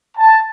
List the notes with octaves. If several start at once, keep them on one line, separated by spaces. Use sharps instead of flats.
A5